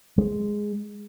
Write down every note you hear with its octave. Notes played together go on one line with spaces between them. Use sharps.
G#3